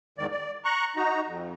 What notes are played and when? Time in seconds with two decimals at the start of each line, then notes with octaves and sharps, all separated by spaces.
0.18 E2 G#2 D#3 D5
0.31 D5
0.64 A#5 C#6 F#6
0.96 D#4 F#4 A#5
1.26 F2